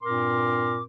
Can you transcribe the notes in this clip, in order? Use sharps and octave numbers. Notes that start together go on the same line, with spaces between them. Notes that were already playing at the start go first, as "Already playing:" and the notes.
G2 A#2 C4 A#4 C6 D6